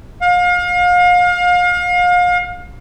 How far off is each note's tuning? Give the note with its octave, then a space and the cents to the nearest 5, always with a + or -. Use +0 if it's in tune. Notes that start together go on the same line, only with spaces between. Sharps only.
F5 +35